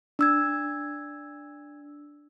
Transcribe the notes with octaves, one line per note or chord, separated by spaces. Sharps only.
D4 E6 G#6